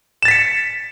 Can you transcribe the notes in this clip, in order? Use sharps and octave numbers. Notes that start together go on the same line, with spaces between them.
A6 B6 C#7 E7